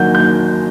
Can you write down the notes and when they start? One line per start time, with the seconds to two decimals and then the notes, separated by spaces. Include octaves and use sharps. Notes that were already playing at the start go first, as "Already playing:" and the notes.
Already playing: D#3 F#3 A#3 G6
0.15 G6